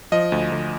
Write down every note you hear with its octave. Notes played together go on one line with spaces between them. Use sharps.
F3 D#5
D2
D2